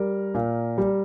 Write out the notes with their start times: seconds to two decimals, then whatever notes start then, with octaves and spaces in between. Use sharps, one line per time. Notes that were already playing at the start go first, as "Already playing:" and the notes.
Already playing: G3 A#4
0.34 A#2
0.78 G3